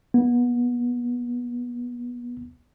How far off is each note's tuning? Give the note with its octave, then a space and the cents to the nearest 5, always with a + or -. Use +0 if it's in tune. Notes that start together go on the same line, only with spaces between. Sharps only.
B3 -25